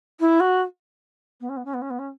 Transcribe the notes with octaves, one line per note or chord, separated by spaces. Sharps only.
E4
F#4
B3
C#4
B3
C#4
B3
C#4
B3
C#4